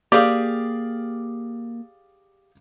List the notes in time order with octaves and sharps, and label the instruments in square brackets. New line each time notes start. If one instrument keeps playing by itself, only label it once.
[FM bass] A#3 [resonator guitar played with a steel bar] G4 G#4 [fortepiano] D5 F5 D6